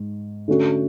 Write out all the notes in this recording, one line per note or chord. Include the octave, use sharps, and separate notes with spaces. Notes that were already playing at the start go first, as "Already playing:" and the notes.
Already playing: G#2
D3 A3 C#4 F#4